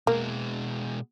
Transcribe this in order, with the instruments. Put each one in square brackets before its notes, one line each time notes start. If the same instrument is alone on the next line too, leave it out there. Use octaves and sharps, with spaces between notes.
[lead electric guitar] B2 G#3 [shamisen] A#3